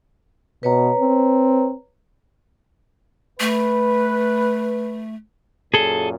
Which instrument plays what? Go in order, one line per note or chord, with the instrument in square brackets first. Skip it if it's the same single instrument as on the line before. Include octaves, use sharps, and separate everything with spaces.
[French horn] B2 [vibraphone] B4 C#5 A#5
[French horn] C4
[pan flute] A3 [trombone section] B4
[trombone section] F#2 A#2 [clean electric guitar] G#4 A4